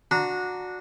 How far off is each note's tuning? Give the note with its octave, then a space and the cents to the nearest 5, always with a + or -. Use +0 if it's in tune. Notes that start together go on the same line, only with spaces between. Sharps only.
D4 +0 F#4 -20 A#5 +0